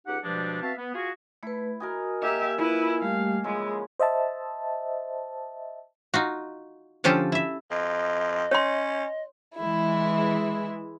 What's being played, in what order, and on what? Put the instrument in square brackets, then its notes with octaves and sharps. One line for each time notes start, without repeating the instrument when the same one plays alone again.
[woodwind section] C#2 D#4 G4 F#5
G2 B2 F3 G3 G#3 D4
B3 C4 F#4 E5 F5 A5
B3
F4 F#4 G#4
[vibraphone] A3 B4 [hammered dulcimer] E4
[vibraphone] F#4 D#6 [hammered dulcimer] A#4 D#5 G#5
[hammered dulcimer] A#3 A#4 G#5 [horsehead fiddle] G4 E5 [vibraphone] D#5
[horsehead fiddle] E4 B4 [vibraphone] F4 [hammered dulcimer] G#5
[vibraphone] G3 A3 G4 [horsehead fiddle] F5
[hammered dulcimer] C#3 F3 E4 [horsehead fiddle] G#3 [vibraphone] E6
[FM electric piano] C5 D#5 E5 A5
[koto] D#4 F4 F#4
D3 F3 C#4 F4 G4 A4
E4 E5
[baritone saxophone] F2 [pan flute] D#5
[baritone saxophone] C#4 [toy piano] C#5 C6
[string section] E3 G#3 E4